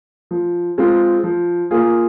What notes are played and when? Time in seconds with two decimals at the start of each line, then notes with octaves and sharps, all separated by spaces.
0.31 F3
0.78 G#3 C4 F4
1.24 F3
1.71 A#3 F4 G#4